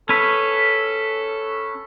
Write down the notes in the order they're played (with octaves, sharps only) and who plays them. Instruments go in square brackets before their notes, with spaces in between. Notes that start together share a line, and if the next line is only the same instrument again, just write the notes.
[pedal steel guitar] C#4 B4 [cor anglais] A4